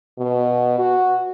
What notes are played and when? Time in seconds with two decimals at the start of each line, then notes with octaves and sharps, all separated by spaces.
0.18 B2
0.79 F#4